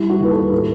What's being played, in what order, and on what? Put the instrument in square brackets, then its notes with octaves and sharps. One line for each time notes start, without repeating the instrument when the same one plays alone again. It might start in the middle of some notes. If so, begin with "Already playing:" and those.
Already playing: [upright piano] G3 E4
F#4
D#2 B4
A4
A2 B4